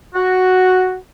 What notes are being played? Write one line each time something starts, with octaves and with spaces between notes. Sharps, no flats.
F#4